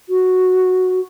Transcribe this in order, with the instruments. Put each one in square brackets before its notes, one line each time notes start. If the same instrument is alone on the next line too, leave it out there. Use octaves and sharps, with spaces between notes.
[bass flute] F#4